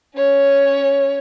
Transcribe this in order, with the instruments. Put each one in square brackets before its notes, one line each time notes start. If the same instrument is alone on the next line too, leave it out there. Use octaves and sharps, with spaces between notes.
[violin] C#4 C#5